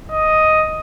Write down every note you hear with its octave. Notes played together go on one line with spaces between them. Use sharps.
D#5